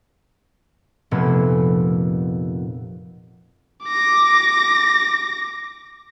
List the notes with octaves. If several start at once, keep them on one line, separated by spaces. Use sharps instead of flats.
F1 A#2 A3 B3 E6 G#6
D6 A#6